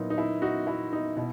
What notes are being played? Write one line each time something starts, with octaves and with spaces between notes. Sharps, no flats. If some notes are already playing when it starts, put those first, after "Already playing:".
Already playing: A#2 F#3 B3 D#4 E4
D#4
E4
D#4 F#4
E4
D#4
B2 E4